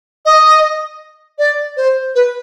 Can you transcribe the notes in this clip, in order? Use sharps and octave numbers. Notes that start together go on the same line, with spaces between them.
D#5
D5
C5
B4